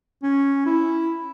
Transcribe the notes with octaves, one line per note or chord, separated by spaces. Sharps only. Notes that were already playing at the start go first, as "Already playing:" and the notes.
C#4
E4